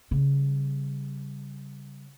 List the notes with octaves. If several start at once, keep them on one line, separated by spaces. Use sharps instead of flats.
C#3 G3